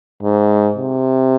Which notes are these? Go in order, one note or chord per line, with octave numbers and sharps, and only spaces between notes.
G#2
C3